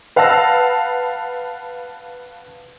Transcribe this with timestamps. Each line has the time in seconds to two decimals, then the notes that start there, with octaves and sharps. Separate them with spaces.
0.16 B4 F5 F#5 A5 E6 A#6